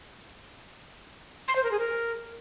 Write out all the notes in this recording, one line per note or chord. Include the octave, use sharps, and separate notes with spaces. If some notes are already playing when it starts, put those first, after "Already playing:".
C6
C5
A#4
G#4
A#4